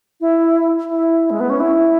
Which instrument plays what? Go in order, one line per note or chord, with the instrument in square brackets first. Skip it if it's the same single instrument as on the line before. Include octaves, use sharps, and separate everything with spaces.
[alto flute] E4
E4
G#3
B3
C#4
E4